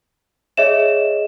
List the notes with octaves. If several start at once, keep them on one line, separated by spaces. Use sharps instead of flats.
G#4 C#5 D#5 E5 E7